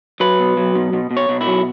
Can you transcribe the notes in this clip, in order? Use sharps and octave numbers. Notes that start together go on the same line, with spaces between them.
F#3 B4
B2
F#3
B2
B2
B2
C#5
B2
E4
F#3